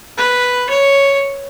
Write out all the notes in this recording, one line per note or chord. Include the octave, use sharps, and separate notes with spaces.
B4
C#5